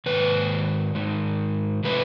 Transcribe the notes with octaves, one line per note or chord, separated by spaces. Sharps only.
G#2 D#3 B4
G#2 D#3 G#3
C3 F3 A3 C4 B4